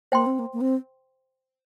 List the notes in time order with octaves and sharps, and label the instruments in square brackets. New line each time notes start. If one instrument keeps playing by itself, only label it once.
[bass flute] A#3 [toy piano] C5 G5 C6
[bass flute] C4
A#3
A#3
C4